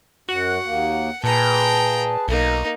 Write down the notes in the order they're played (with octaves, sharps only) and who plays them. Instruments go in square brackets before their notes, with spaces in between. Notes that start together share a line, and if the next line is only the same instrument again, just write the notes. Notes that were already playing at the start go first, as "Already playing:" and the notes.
[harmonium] F#2 [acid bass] F#4 [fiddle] F#5
[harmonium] D#2 A#3
[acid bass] A#2 [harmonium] G#4 B4 A5 [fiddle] G5 A#5
[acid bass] B1 [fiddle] A#3 D#4